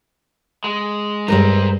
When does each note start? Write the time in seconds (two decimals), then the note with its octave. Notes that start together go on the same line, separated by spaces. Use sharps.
0.64 G#3
1.28 G2 A#2 G3 G#3 A#4 C5 A#5